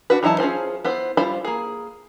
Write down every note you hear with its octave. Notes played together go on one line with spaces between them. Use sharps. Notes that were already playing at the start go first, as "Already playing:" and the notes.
D4 F#4 B4
E3 F#3 D#4 E4 A5
C#4 F4 G#4 C5
B3 E4 C5
G3 E4 F4 C5 B5
A#3 G#4